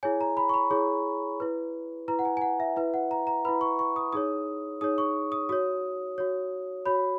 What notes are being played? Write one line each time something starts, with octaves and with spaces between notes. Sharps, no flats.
E4 G#4 C#5 G#5
A#5
B5
C#6
B5
E4 G#4 C#5
E4 B4
E4 B4 A#5
F#5
G#5
G#5
F#5
E5
E4 B4 E5
F#5
A#5
A#5
E4 B4 B5
C#6
C#6
D#6
D#4 G#4 C#5 D#6
D#4 G#4 C#5 D#6
C#6
D#6
F#4 C#5 D#6
F#4 C#5
F#4 C#5 B5